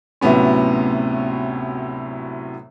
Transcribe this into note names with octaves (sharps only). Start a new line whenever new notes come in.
D2 A2 C3 F#3 B3 C#4